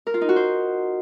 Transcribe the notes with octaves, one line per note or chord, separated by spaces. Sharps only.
A#4
F4
D#4
F#4
C5